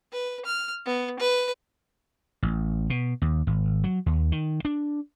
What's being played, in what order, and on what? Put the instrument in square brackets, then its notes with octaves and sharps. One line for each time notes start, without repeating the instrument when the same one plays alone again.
[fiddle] B4
F6
B3
B4
[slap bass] A1
B2
D#2
G#1
F#3
D#2
D#3
D4